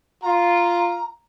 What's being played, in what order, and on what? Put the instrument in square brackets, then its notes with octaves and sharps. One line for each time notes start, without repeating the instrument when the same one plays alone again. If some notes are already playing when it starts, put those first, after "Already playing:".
[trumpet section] F4 [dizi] A#5